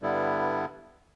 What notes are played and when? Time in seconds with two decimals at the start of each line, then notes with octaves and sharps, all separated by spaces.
0.02 G2 D3 G3 B3 E4